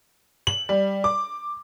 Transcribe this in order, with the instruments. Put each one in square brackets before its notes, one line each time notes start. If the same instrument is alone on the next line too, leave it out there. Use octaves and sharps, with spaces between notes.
[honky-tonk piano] F#7
G3
D6